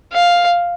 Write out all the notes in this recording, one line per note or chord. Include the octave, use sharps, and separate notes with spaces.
F5